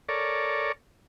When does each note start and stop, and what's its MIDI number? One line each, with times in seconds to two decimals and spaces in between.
0.09 0.72 69
0.09 0.72 70
0.09 0.72 73
0.09 0.72 74